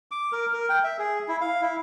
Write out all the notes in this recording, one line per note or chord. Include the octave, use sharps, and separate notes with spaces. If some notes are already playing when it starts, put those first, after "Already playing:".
D6
A#4
A#4
G5
E5
G#4
E4
F5
E4